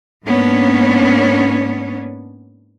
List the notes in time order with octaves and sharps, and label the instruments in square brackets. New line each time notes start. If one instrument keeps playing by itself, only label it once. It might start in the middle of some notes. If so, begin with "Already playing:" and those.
[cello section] G#2 A#3 B3 C#4 D4 C#5